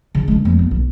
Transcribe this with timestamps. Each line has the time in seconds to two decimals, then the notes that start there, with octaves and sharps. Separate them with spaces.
0.15 C#3
0.28 G#3 C#4
0.45 F2 A#3
0.59 B3
0.71 B1